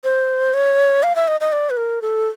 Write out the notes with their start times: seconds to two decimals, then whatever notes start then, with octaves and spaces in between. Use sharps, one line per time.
0.04 C5
0.54 C#5
1.03 F5
1.15 E5
1.28 D#5
1.41 D#5
1.52 D5
1.70 B4
1.77 A#4
2.02 A4